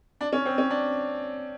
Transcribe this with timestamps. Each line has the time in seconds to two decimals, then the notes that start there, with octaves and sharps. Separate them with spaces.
0.21 D4
0.33 C#4
0.46 C4
0.58 C#4
0.70 D4